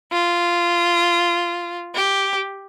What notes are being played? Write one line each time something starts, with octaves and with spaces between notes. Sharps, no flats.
F4
G4